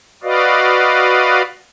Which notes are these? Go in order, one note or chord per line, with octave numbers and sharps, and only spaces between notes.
F#4 B4 D5 D#5 F5